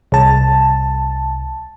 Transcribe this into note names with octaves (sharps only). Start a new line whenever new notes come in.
C2 A5